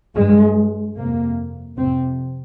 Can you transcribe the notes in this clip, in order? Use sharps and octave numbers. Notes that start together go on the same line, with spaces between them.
G2 G#3
F2 C3 A#3
F2 C3 C4